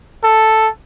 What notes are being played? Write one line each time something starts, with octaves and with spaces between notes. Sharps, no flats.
A4